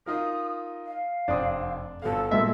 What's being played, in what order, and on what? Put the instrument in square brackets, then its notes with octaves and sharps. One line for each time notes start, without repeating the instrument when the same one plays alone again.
[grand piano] D#4 F4 A#4 [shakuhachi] D#6
[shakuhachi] F5
[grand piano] F1 C4 D#6 [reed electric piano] F2 [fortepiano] D4
[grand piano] G1 B3 F5 [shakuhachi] A4
[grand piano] G2 A#2 B3 [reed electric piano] G#3 A#3 D#5 [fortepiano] E5